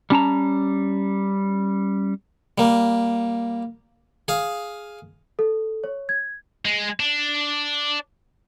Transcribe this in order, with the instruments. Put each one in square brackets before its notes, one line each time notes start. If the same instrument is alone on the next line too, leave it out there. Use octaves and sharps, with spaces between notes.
[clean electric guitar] G3 C#4 A5 A#5
[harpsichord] G3 A#3
G#4 F5
[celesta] A4
C#5
G#6
[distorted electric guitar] G#3
D4